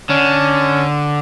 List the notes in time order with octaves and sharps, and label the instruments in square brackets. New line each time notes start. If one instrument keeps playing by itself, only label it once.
[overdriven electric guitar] D3 [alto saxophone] C#4